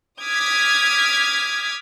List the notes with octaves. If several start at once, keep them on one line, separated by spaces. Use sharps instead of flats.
D6 D#6 F6 G#6 B6